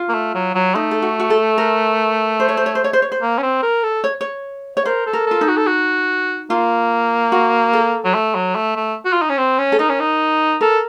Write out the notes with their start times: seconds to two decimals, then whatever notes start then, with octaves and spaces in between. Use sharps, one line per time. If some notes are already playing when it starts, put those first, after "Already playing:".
Already playing: F4
0.09 A#3
0.14 A3
0.34 F#3
0.55 F#3
0.75 A3 D#4
0.91 A4
1.02 F#4
1.20 F#4
1.30 A4
1.58 A#4
2.40 C5
2.49 C#5
2.57 C5
2.66 C#5
2.75 C5
2.84 C#5
2.93 C5
3.02 C#5
3.12 C5
3.22 A#3
3.38 C#4
3.43 C4
3.63 A#4
3.83 A4
4.04 C#5
4.21 C#5
4.77 C#5
4.85 A#4 C5
5.06 A4
5.13 A#4
5.27 F4 A4
5.41 D#4
5.48 F#4
5.57 A4
5.67 F#4
6.50 A#3 F4
7.32 F#4
7.73 A4
8.05 F#3
8.14 A3
8.35 F#3
8.55 A3
8.76 A3
9.05 F#4
9.13 F4
9.22 D#4
9.29 C#4
9.37 C4
9.59 C#4
9.72 A4
9.79 D#4 A#4
9.89 C#4
10.00 D#4
10.61 A4 A#4